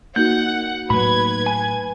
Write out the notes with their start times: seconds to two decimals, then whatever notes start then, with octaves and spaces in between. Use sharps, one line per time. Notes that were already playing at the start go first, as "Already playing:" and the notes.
0.16 A#3 D#4 F#4 F#5 G6
0.90 A2 F#3 B4 B5 G#6
1.46 G#5